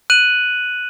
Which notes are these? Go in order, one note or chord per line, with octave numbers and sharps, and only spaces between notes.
F#6 D#7 F#7